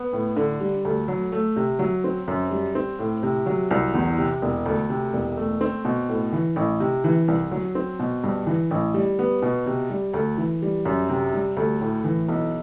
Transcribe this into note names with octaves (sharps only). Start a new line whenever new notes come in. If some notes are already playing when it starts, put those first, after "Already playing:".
Already playing: B3
A2
D3
G3
D2
F#3
A3
C3
F#3
C4
F#2
G3
C4
A2
C3
F#3
C2
E2
C3
E1
D2
C3
E1
A3
C4
B2
A2
E3
A1
C3
E3
C2
F#3
C4
B2
G2
E3
A1
G3
B3
B2
C3
G3
D2
E3
G3
F#2
C3
G3
D2
A2
E3
B1